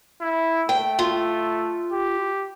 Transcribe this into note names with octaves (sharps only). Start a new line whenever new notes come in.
E4
A3 G5
F4
G4